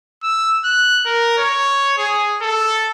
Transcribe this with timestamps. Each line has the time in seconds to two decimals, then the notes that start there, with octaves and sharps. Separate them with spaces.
0.23 E6
0.64 F#6
1.06 A#4
1.38 C#5
1.98 G#4
2.42 A4